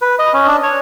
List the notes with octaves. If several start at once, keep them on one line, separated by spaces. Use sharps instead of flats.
B4
D#5
C#4
D4
C#5